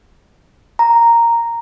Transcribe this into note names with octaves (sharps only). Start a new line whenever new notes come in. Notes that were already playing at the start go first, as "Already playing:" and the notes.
A#5